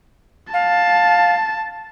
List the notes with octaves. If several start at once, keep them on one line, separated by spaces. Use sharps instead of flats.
F5 A5